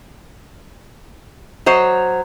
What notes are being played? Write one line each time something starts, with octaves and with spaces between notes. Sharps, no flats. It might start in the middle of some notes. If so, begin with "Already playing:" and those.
F#3 C5 C#5 D#5